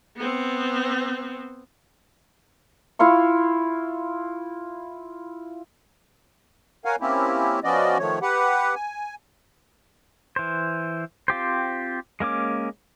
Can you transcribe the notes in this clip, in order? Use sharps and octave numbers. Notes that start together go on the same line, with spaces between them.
B3 C4
E4 F4 F5 C#6
A#4 C#5 F5 F#5 G#5
A#3 C4 C#4 E4 G4
F3 B3 C#4 F#4 D5 D#5
D#3 F3 A3 C#5
G4 B4 F#5
G#5
E3 C5
C4 F4 G4 C5
G#3 A#3 C#4 D6